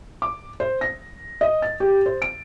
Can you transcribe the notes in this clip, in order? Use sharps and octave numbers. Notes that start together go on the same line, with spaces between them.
D6
C5
A#6
D#5
A6
G4
C5
D7